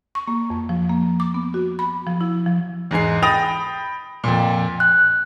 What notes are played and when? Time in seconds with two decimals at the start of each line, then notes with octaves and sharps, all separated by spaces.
0.15 C#6
0.28 A#3
0.50 F2
0.69 F3
0.90 A#3
1.20 D6
1.34 B3
1.54 F#4
1.79 B5
2.07 F3
2.21 E4
2.46 F3
2.91 E2 G#2 G#4 C7
3.23 G5 B5 D#6 A6 A#6 F7
4.24 F2 A#2
4.80 F#6